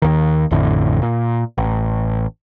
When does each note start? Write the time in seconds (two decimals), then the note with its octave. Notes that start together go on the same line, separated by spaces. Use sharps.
0.02 D#2 D#3
0.51 A1 F2 A2 D3
1.02 A#2
1.58 A1